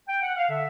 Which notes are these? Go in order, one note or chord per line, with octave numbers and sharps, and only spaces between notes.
G5
F#5
F5
D3 E5